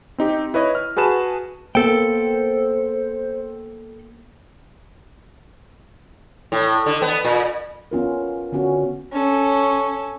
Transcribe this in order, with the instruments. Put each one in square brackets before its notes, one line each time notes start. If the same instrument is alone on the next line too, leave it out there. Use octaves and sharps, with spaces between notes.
[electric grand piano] C4 D#4 G4
E4 B4 C#5 D#5
F6
F#4 G#4 B4 A5 E7
[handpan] A#3 B3 [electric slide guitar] A4 G5 [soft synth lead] C5
[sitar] A2
D3
B3
A#2
[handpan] B3 C#4 F4 A#4
D3 B3 C#4 F#4
[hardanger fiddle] C#4 A4